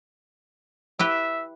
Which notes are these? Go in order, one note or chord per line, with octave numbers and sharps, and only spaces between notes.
E4 G4 B4 E5